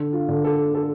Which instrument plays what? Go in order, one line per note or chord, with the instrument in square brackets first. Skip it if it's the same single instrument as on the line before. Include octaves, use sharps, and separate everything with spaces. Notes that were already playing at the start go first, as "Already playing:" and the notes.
Already playing: [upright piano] D3 [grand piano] A4
[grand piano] F4
[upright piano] D3
[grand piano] A4
A4